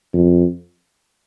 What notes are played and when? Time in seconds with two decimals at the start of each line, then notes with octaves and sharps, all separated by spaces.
0.14 F2